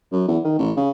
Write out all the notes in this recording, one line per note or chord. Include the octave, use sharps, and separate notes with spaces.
F#2
E2
D#3
A1
C#3